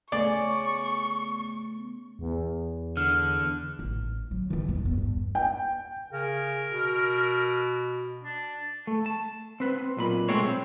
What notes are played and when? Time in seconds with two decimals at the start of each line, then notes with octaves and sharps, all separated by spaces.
0.12 C#3 A3 B3 D5 C#6
2.19 E2
2.97 D3 F6
3.79 A1
4.31 F#3
4.50 E3 E4
4.68 D#1
4.85 E2 G2
4.98 G2
5.35 G5
6.13 C#3 A#4
6.71 B2
8.24 D4
8.87 A3
9.06 A5
9.60 C4 B4
9.97 B1 A#2 B5
10.29 G#3 A3 C4 C#5
10.47 C4